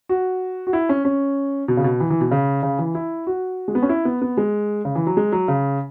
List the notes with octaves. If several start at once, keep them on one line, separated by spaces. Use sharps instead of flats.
F#4
F#4
E4
C#4
C#4
B2
C#3
B2
E3
E3
B2
C#3
C#3
E3
E4
F#4
G#3
B3
C#4
E4
B3
B3
G#3
C#3
E3
F#3
G#3
F#3
C#3